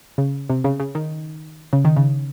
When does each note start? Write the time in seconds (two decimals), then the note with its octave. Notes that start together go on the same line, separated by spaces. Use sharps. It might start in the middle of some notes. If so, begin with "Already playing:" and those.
0.18 C#3
0.50 C3
0.64 C#3
0.80 C#3
0.95 D#3
1.73 C#3
1.85 D#3
1.97 C#3